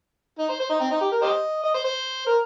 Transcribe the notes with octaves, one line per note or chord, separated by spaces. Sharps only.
D#4
C5
C5
D#4
C4
D#4
G4
A#4
G4 C5 D#5
D#5
C5
C5
A#4